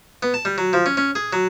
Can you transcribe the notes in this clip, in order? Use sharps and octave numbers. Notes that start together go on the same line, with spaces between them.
B3
A5
G3
F#3
F3
C#4
C#4
G#4
F#3